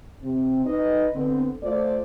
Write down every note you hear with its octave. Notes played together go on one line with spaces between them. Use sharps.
C3 C4
D#4 B4 D#5
D3 B3 C4
A3 F4 C5 D5